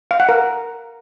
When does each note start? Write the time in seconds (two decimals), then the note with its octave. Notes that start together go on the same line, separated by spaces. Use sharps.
0.11 F5
0.20 F#5
0.29 A#4